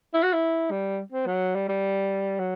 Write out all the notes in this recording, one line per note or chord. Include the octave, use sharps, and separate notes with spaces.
E4
F#4
E4
G3
C4
F#3
G3
G3
F#3